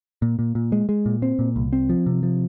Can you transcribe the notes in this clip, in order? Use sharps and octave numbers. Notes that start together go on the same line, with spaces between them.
A#2
A#2
A#2
G#3
G#3
A#2
C4
A#2
C2
C4
F3
C3
F3